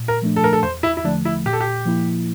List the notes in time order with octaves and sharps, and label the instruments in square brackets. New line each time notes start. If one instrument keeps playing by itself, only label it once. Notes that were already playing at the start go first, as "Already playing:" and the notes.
Already playing: [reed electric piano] A#2
[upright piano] A#4
[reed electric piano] F3 A3 D4
[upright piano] A4
A#4
A4
[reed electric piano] E2 [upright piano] C5
[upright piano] E4
E4
[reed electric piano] D3 F3 A3 [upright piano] D4
[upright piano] E4
[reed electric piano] A#2 [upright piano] G4
[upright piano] A4
G4
[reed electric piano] F3 A#3 E4